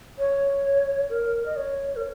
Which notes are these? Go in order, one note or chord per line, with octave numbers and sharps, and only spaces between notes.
C#5
A#4
D#5
C#5
A#4